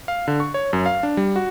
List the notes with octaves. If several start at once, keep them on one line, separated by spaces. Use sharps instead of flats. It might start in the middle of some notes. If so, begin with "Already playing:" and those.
F5
D3
C#6
C#5
F#2
F5
D4
G3
F#4